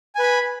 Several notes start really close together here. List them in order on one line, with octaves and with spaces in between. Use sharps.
G#5 B4 B5